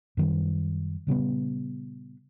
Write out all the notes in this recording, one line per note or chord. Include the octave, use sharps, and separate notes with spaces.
F#2 D#3 G3
A#2 C#3 G3 B3